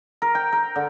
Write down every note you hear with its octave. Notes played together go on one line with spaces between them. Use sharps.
A#4
G5
A#4
D3